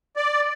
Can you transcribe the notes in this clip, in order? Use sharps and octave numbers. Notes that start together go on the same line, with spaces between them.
D5